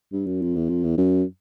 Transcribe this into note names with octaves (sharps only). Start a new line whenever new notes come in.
G2
F#2
F2
E2
F2
E2
F#2